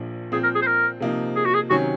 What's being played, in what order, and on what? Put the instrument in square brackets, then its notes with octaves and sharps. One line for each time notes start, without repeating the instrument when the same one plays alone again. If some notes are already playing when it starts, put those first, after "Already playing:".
Already playing: [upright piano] A#1 A#2 F3
[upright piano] A#2 F3 C4 [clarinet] G#4
[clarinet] A#4
G#4
C5
A#4
[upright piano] C3 F3 A#3 D#4
[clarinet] G#4
F#4
G#4
[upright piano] C3 D#3 F#3 C#4 [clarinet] F#4